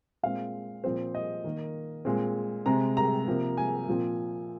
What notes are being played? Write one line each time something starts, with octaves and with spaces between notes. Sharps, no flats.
A#2 G#3 C4 F5
A#2 F3 C4 C5
D#5
D#3 A#3
A#2 G#3 C4
C3 G#3 C4 A#5
A#5
C3 F3 A#3
G#5
A#2 F3 C4